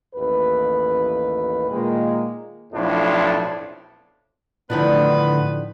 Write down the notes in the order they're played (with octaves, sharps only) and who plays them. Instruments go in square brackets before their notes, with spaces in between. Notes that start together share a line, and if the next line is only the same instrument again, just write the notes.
[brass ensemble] A1 D#2 B4
A#2 D#3 G#3 A#3
[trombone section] B1 F2 A2 D4
[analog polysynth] A2 D3 [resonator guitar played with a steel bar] D#3 F3 D4 [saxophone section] B3 B4